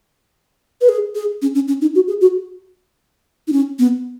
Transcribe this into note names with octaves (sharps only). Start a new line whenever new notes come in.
B4
G#4
G#4
C#4
C#4
C#4
D#4
F#4
G#4
F#4
D#4
C#4
B3